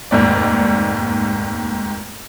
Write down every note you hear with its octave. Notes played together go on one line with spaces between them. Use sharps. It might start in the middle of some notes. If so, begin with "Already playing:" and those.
F1 D#2 G#2 D5